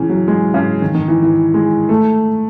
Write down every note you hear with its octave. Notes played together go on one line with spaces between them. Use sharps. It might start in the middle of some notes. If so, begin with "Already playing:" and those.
Already playing: C#3 E3
F#3
G#3
C#3
D#3
D#3
E3
E3
G#3
A3